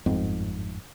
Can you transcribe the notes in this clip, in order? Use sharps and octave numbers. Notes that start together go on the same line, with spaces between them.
G1 F2 G#2 C4